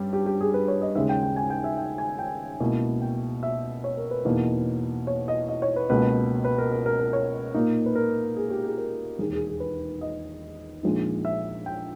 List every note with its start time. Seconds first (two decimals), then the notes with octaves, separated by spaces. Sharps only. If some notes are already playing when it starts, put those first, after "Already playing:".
Already playing: G2 G3 C#4
0.13 G4
0.26 G4
0.41 G#4
0.54 B4
0.68 C#5
0.82 D#5
0.95 D#2 C#3 G#3 E5
1.09 G5
1.23 G5
1.36 G#5
1.50 G5
1.64 E5
1.78 G5
1.98 G#5
2.19 G5
2.60 C#2 B2 A#3 E4
3.01 G5
3.43 E5
3.84 C#5
3.97 A#4
4.11 B4
4.25 E2 B2 A#3 D#4
5.07 C#5
5.28 D#5
5.48 D#5
5.62 C#5
5.76 B4
5.90 C#2 B2 A#3 B4
6.44 B4
6.58 A#4
6.72 A#4
6.86 A#4
6.99 A#4
7.13 C#5
7.54 A#2 A#3 D#4
7.86 B4
7.95 A#4
8.36 G#4
8.50 G4
8.64 G#4
8.78 A#4
9.19 E1 D#2 D#3 G#4
9.33 G#4
9.47 G#4
9.60 B4
10.01 D#5
10.83 A#1 A#2 G#3 D#4
11.25 E5
11.66 G5